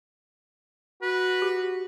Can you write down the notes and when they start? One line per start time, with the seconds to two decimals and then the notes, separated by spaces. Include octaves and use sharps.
1.02 F#4 B4
1.42 G4